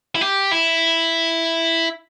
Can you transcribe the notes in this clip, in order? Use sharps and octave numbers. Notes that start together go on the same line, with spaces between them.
E4
G4
E4